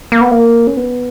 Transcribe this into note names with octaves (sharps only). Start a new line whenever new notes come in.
A#3
B3
A#3
C#4
B3